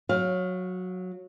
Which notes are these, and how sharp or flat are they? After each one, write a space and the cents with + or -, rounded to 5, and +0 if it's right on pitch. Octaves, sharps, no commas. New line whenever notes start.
F#3 -10 F5 +15